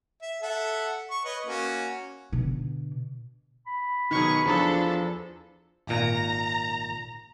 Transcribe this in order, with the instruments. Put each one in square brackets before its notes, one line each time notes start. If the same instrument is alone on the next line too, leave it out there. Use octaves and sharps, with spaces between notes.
[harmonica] E5
A4 E5 F#5
C#6
B4 C#5 D#5
A#3 C#4 F#4
[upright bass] B2 D3
[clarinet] B5
[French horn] B2 [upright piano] D#3 F#3 [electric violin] G#4 C#6
[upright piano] E2 [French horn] F3 [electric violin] D4 A4
[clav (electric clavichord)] G#1 A#2 [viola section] A#5